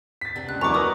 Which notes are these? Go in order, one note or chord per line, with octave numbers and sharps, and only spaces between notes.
A6 B6
C3 B3 D4
C#2 F#6
D#2 F#3 G3 B3 E4 A#5 C#6 D6
D#4 A#4 B4 D6 D#6